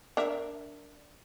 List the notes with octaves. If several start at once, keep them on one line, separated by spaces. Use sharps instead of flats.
D4 A#4 E5